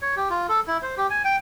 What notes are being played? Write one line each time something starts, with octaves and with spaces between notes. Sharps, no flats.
C#5
G4
F4
A4
E4
C5
G4
G#5
G5